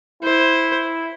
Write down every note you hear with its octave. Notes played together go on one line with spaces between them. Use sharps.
E4 C5